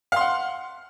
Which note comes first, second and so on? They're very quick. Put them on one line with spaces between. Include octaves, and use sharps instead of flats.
F5 C6 F#5